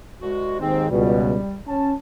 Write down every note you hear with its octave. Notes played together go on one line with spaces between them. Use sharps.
C2 G#3 F#4
D#2 G#2 D#3 C4
C#2 B2 G3
C#4 A5